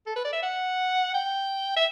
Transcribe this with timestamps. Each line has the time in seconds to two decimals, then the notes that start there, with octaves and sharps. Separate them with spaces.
0.06 A4
0.16 B4
0.25 D5
0.33 E5
0.43 F#5
1.14 G5
1.76 E5